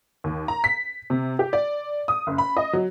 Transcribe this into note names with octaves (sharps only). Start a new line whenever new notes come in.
D#2
A#5
B6
C3
G4
D5
D#6
F#1
B5
D#5
F#3